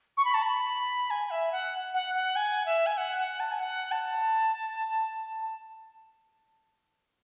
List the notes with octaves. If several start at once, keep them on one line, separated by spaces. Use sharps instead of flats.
C#6
B5
A5
B5
G#5
E5
F#5
F#5
F#5
G#5
E5
G#5
F#5
F#5
A5
G#5
F#5
A5